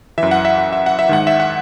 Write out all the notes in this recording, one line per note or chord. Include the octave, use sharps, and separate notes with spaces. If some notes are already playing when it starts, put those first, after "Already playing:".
F#2 E3 E5
F#5
E5
F#5
E5
F#5
E5
G#2 D#3 F#5
E5
F#5